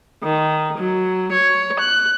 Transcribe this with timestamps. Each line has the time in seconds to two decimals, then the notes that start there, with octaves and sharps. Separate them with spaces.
0.23 D#3
0.77 F#3
1.32 C#5
1.80 F#6